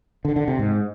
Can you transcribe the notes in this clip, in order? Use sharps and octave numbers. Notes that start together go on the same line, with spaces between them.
D3
D3
C3
G#2